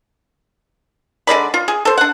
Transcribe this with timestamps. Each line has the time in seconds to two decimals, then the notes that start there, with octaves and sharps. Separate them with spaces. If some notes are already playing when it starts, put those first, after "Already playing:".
1.27 D3 G#3 D5 B5
1.54 F4
1.68 G#4
1.85 A4 C5
1.98 D4 F#5